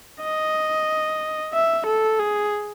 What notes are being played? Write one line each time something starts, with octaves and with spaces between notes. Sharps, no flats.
D#5
E5
A4
G#4